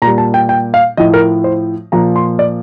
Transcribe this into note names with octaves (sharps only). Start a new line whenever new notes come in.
A#2 A#5
G3
A5
G5
G5
F5
A2 F3 D#5
A#4
C5
A#2 F3 A#5
C6
D5